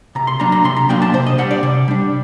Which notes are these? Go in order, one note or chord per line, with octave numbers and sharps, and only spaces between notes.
C3 A#5
C6
F#3 A#3 D4 A#5
A#5
C3 C6
A#5
F#3 A#3 D4 G5
A5
C3 C5
D#5
G3 D4 F#5
D5
C3
G3 D4